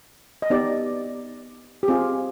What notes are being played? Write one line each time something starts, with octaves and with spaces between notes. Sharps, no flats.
D#5
B3 D#4 G4 D5
G4
C4 F4 G#4